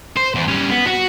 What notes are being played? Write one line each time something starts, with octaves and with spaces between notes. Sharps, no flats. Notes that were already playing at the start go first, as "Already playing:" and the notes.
C5
E2
G3 C#4
B3
F#4